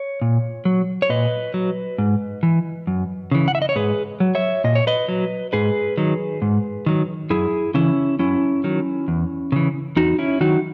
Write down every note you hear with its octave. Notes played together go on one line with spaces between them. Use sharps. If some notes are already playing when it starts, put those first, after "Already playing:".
Already playing: C#5
A#2
F#3
C#5
A#2 B4 D#5
F#3
G#2
E3
F#2
C#3 E3
F#5
E5
D#5
C#5
G#2 G#4 B4
F#3
C#5 E5
A#2 D#5
C#5
B4 D#5
F#3
G#2 G#4 B4
D#3 F#3
G#2
D#3 F#3
F#2 E4 G#4
C#3 E3 C#4 E4
F#2 C#4 E4
D#3 F#3
E2
C#3 E3
E2 D#4 F#4
C#4 E4
D#3 F#3 D#4 F#4